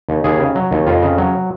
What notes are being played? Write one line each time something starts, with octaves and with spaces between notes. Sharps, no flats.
D#2
D#2 G#4
C#3
F#3
D#2
F2 F4
C#3
F#3